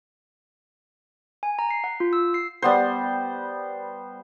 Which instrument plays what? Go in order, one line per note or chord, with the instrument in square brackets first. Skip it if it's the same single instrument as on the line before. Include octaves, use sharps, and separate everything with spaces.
[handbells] G#5
A#5
C7
F#5
F4
E6
C7
[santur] G3 B3 C5